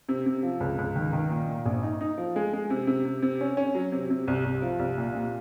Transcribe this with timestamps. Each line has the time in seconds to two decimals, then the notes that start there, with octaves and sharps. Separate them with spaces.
0.09 C3
0.26 C3
0.43 F3
0.60 C#2
0.78 C#2
0.96 D#3
1.13 D#3
1.30 A#2
1.48 A#2
1.66 A#1
1.83 D#4
2.01 D#4
2.18 F3
2.36 G#3
2.53 G#3
2.70 C3
2.87 C3
3.05 C3
3.22 C3
3.41 C#4
3.57 C#4
3.75 F#3
3.92 C3
4.10 C3
4.28 C2
4.45 C2
4.62 F3
4.79 C2
4.97 A#2
5.14 A#2